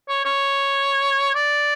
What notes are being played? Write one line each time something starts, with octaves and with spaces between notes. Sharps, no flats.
C#5
C#5
D5